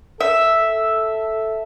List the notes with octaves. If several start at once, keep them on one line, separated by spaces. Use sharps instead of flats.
A4 E5